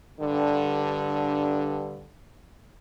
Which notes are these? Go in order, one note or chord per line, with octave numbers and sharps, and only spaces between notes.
G2 D3